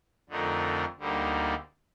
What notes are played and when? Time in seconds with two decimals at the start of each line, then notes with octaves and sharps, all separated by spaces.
0.29 F2 D3 A3 D#4 A#4
0.98 D2 D3 G3 A#3 D#4